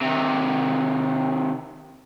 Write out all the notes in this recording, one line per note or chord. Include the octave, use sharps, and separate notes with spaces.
C3 D#3